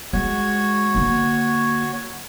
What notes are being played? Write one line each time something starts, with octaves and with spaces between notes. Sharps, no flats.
G#3 F#4 C#5
D3 A#3